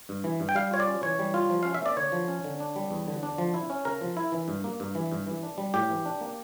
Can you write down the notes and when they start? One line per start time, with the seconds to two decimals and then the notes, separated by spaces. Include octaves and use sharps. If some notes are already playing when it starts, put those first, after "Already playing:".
0.09 G2
0.24 E3
0.40 G2
0.49 G5
0.55 G3 F5
0.71 F4 C#5
0.80 D5
0.88 C#4
1.03 E3 C#5
1.19 G3
1.34 F4
1.50 F3
1.63 C#4 F5
1.74 E5
1.82 A#3 D5
1.97 D3 C#5
2.12 F3
2.28 C#4
2.44 D3
2.60 D4
2.76 G3
2.91 E2
3.08 D3
3.23 D4
3.38 F3
3.54 E4
3.70 C#4
3.85 C#3 A#4
4.01 F3
4.17 E4
4.32 E3
4.48 G2
4.64 A#3
4.80 G2
4.95 E3
5.12 G2
5.27 E3
5.43 D4
5.58 G3
5.74 A2 G4
5.90 E3
6.06 D4
6.21 A#3